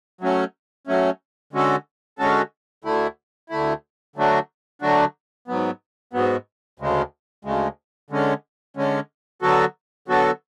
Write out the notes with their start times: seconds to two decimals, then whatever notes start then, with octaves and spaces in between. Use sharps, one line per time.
0.21 F#3 A3 C#4
0.87 F#3 A3 C#4
1.53 D3 G#3 C#4 F#4 A4
2.19 D3 G#3 C#4 F#4 A4
2.84 D2 D3 A3 E4
3.50 D2 D3 A3 E4
4.16 D3 F#3 A3 D4 F#4
4.82 D3 F#3 A3 D4 F#4
5.48 G#2 F#3 B3
6.13 G#2 F#3 B3
6.80 D2 C#3 G#3
7.45 D2 C#3 G#3
8.10 D3 G#3 C#4
8.77 D3 G#3 C#4
9.42 D3 F#3 B3 F#4 A4
10.08 D3 F#3 B3 F#4 A4